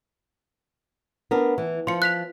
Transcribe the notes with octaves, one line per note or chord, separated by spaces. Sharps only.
B3 D4 A#4
E3
F3 C6 C#7
F#6 B6 F7